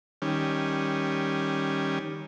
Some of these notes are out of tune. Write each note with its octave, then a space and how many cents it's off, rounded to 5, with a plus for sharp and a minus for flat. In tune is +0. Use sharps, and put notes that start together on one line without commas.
D#3 +0 G3 +0 C#4 -10